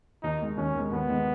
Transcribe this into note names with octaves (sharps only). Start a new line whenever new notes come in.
D#2 D#4
D#3 G#3
D#2 C#4
D#3 G#3
D#2 B3
D#3 G#3